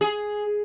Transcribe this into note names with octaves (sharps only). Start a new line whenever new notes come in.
G#4